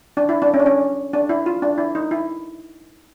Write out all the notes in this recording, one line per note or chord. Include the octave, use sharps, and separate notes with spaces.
D4
E4
D4
C#4
D4
C#4
D4
E4
F4
D4
E4
D#4
E4